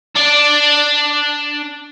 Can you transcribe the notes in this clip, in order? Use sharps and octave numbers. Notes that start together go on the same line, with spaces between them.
D4 D5